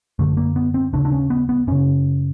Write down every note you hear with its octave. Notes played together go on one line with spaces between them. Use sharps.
F#2 D3 A3
A#3
B3
C4
D#2 C#3 D4
D4
C#4
B3
B3
F#2 C#3 C#4